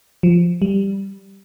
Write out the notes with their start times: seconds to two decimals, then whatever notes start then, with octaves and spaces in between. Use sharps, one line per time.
0.23 F3
0.62 G3